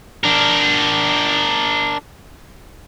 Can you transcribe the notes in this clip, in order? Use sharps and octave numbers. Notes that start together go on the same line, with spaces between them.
D4 A#4